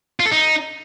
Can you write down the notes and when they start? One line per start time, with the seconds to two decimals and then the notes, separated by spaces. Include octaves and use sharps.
0.20 F4
0.26 A4
0.31 D#4